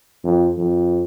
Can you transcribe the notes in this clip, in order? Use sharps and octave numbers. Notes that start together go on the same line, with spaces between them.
F2
F2